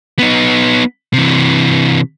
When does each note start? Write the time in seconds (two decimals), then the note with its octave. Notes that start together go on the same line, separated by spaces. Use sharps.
0.19 B3 D#4
1.14 C3 E3